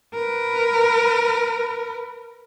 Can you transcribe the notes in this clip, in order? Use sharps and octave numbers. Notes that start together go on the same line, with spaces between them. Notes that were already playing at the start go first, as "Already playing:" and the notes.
A#4 B4